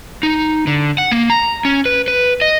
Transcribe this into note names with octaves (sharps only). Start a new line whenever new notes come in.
D#4
D3
F#5
A#3
A#5
C#4
B4
B4
D#5